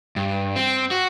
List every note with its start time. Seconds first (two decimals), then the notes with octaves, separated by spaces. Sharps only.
0.16 G2
0.56 C4
0.91 F#4